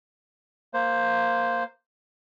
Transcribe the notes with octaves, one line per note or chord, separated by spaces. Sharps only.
A#3 C5